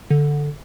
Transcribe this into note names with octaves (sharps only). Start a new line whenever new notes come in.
D3